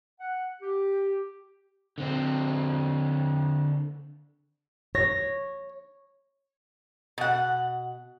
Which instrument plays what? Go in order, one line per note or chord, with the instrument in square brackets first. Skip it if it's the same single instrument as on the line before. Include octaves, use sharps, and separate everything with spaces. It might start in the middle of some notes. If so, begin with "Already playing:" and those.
[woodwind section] F#5
G4
[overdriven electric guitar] D3 C4
[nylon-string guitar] C#5 [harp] A#6
[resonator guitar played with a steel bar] B2 F#5